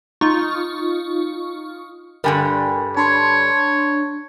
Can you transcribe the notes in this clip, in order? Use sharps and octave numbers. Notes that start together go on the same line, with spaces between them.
D#4 F4 C#6
G2 D3 G3 A#4 G5 G#5
D4 C#5 A5 B5 C6